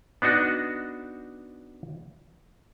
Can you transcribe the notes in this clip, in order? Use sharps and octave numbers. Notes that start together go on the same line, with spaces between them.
B3 D4 D#4 F#4